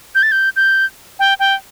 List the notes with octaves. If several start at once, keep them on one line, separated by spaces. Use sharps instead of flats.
G6
A6
G6
G6
G5
G5